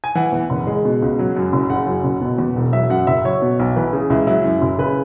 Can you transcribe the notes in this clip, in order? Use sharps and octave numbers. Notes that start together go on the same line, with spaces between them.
G#5
E3 F#5
E2
F#1
G#3
B2
C#2
F#3
F#2
F#1
C#3 F#5
F#2
F#1
B2
E2
E1
F#3 E5
F#2 F#5
F#1 E5
F#3 C#5
B2
B1
E3 B4
C#3 G#4
C#2 E4
F#3 E4
F#2
F#1
C#3 B4